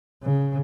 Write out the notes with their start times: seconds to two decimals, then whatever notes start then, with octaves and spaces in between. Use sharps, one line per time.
0.23 C#3